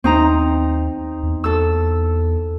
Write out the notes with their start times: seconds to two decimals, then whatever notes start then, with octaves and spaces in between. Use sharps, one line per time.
0.04 D#2 C4 D#4 A#5
1.23 E2
1.44 A4 E6